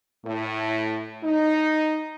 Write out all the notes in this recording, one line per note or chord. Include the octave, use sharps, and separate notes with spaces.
A2
D#4